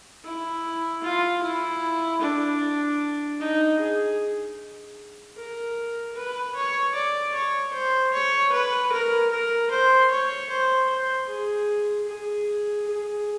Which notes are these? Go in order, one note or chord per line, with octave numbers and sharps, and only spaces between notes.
E4
F4
E4
D4
D#4
G#4
A#4
B4
C#5
D5
C#5
C5
C#5
B4
A#4
A#4
C5
C#5
C5
C5
G#4
G#4
G#4